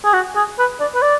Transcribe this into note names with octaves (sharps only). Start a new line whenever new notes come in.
G#4
F#4
G#4
B4
D5
B4
D5